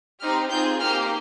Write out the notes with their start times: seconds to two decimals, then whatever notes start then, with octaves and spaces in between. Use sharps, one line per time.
0.20 C4 D#4 G4 F6
0.50 C4 F4 G#4 G6
0.80 A#3 D#4 G4 F6